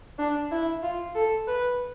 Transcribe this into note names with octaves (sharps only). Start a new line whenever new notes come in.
D4
E4
F4
A4
B4